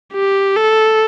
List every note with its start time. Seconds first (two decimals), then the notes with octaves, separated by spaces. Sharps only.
0.13 G4
0.56 A4